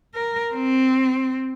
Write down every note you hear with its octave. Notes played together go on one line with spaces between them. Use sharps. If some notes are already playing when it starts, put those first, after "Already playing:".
A#4
C4